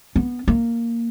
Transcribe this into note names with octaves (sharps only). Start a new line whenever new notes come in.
B3
A#3